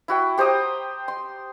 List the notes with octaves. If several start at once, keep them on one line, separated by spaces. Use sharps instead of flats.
E4 F#4 G5
G4 C5 A#5 D#6
C6